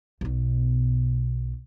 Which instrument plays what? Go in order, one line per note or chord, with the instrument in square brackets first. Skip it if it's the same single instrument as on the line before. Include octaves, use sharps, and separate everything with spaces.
[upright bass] B1 B2